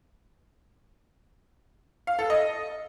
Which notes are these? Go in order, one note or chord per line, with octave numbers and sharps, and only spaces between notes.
F5
A4
D#5